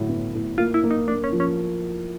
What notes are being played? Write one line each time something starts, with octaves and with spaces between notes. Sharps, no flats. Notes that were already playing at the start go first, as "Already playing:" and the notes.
Already playing: A2 D3 F#3
B3
A2
A#3 F4
E4
A#3
D#4
A#3 D4
C#4
F3
C#4